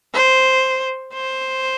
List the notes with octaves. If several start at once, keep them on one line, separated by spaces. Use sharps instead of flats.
C5
C5